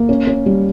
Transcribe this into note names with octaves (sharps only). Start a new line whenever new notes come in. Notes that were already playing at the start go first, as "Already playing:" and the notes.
Already playing: A#3
C#4
C#4
G3